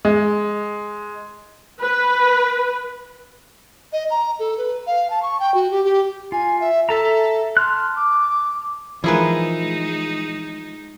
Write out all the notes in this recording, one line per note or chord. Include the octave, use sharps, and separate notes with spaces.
G#3
B4
D#5
A#5
A4
B4
F5
A5
C#6
G5
F#4
G4
G4
F4 G#5
E5
A4 E5 A5 A#5
A5 C6 F6 F#6
D6
E3 F3 G#3 D#4 E4 G#4 A#4 B4